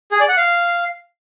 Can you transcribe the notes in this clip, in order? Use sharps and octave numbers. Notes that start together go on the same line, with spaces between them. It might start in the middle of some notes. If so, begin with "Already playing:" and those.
G#4
D5
F#5
F5